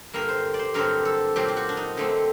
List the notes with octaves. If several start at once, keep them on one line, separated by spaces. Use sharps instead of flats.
G2 D3 G3 A#3 A#4
C5
D5
C5
G2 D3 F#3 C4 A#4
A4
A#2 F#3 C4 G4
G4
F#4
D4
D#4
D3 A3 C4